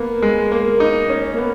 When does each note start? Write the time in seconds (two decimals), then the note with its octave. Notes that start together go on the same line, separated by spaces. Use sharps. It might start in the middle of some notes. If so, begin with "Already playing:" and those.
Already playing: A#3 B3
0.22 G#3
0.52 A#3
0.80 D#4
1.09 C#4
1.33 A#3
1.38 B3